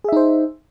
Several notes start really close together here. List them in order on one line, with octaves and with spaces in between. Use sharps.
G#4 E5 D#4 C5